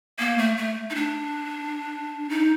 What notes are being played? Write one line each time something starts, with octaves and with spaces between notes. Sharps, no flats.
A#3
A3
A3
D#4
D4
D#4